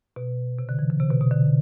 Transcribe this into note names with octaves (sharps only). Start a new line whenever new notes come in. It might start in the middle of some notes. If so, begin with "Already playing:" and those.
B2
C3
D3
E3
D3
C3
B2
B2
D3